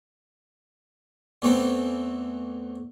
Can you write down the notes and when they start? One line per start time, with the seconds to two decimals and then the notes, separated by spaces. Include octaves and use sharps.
1.42 E2 E3 A3 C4